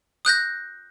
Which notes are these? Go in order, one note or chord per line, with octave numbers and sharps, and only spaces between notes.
D#6 F#6 G6 A#6